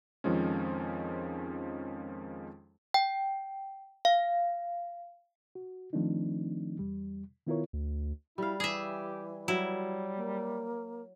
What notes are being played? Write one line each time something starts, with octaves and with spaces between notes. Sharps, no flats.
F2 D#3 F3 G#3 C#4
G5
F5
F#4
D#3 F3 A3 C4 D4 D#4
E2 G3
D#3 B3 E4 F4 A#4 C#5
D2
G3 E4 F5
E3 G4 G#4 E5
F#3 G3 E4
A#3